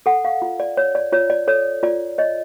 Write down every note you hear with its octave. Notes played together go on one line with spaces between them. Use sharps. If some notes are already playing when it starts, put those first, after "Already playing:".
A4 F#5
F5
F4
D5
C#5
D5
F4 C#5
D5
A4 C#5
F4 D5
C#5 D#5